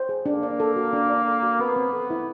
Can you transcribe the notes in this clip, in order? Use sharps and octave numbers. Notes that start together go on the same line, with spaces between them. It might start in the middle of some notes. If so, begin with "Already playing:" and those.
Already playing: C5
G#4
A#3 D4
D5
A4
F#4
D4
D5
A4
F#4
B3 C4
C4
A4
E4